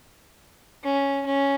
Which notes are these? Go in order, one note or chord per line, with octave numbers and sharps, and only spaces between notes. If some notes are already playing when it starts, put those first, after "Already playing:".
C#4
C#4